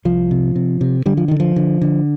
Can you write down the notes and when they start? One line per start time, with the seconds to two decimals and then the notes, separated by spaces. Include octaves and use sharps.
0.05 C2 F3
0.31 C3
0.55 C3
0.81 C3
1.06 D3 G3
1.17 F3
1.28 D3 D#3
1.40 F3
1.56 D3
1.81 D3